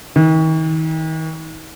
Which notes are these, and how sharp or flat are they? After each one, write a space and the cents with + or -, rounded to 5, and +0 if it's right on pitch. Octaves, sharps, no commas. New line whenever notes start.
D#3 +40